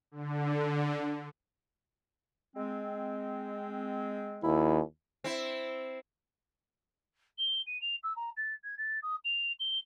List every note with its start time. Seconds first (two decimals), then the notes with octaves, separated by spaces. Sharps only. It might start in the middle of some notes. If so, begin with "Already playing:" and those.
0.11 D3
2.55 G#3 C4
4.43 D#2 E4
5.24 C4 E4
7.38 G7
7.66 D#7
7.81 F7
8.03 E6
8.16 A#5
8.37 A6
8.64 G#6
8.78 A6
9.02 D#6
9.24 F7
9.59 G7